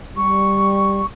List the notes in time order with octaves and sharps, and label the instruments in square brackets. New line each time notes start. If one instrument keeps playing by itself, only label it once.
[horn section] G3 [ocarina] C#6